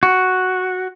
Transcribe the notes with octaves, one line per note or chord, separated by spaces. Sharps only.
F#4